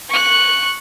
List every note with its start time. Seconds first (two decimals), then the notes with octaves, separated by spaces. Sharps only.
0.10 C#6 F#6